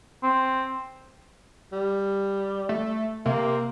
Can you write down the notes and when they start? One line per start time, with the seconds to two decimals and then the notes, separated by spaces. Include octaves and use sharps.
0.24 C4
1.73 G3
2.69 A3
3.26 C3 A#3